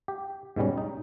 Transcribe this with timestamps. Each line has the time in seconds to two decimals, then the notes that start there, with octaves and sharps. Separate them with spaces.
0.08 G4
0.56 G#2 B2 G3 C#4
0.78 D#4